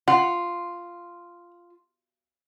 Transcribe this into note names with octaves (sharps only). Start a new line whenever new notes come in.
F4 F#5